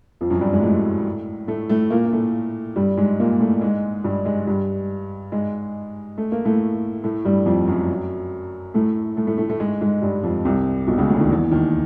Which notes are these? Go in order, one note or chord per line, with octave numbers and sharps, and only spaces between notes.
F2 F3
F#2 F#3
G2 G3
G#2 G#3
A2 A3
A2 A3
A2 A3
A#2 A#3
A#3
A2 A3
G2 G3
G#2 G#3
A#2 A#3
A2 A3
G#2 G#3
G2 G3
G#2 G#3
G2 G3
G#2 G#3
A3
A#3
A2 A3
A2 A3
G2 G3
F2 F3
F#2 F#3
A2 A3
A2 A3
A2 A3
A2 A3
A2 A3
G#2 G#3
G#2 G#3
G2 G3
F2 F3
C2 C3
B1 B2
C#2 C#3
D2 D3
D#2 D#3
E2 E3
D#2 D#3